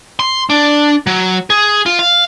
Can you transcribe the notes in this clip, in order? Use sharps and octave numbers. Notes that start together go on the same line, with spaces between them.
C6
D4
F#3
G#4
F4
F5